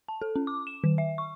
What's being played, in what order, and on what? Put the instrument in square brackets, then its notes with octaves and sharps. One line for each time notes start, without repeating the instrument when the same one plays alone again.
[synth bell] A5
A4
C#4
D6
E7
D#3
E5
C#6